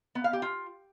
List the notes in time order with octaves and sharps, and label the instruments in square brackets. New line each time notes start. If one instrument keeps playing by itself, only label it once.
[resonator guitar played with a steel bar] B3
F5
G4
F4